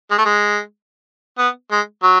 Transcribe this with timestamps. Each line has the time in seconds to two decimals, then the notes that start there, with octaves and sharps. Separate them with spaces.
0.11 G#3
0.18 A3
0.25 G#3
1.38 B3
1.71 G#3
2.03 F#3